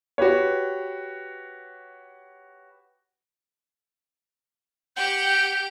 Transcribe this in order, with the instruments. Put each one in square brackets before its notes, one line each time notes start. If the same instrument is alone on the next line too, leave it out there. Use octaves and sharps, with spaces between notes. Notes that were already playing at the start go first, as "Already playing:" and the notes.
[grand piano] F#4 G4 B4 C#5
[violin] G4 G5 [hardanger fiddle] F#5 [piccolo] G6